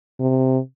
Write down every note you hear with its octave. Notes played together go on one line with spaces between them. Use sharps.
C3